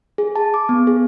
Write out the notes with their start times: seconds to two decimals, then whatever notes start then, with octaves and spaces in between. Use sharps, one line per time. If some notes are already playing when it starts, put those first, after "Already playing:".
0.18 G#4
0.36 A5
0.54 D6
0.69 B3
0.87 G#4